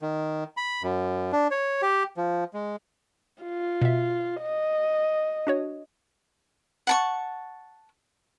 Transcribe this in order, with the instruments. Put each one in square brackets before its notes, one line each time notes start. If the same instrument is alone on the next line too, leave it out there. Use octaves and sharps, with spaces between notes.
[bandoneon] D#3
B5
F#2
D4
C#5
G4
F3
G#3
[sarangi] F4
[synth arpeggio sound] B2 E5
[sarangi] D#5
[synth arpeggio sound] D4 F#4 C#5
[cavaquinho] F#5 A5 C#6